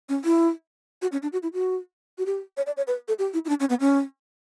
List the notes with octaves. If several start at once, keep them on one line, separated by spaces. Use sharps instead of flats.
C#4
E4
F#4
C#4
D4
F#4
E4
F#4
F#4
G4
C#5
D5
C#5
B4
A4
G4
E4
E4
D4
C#4
B3
C#4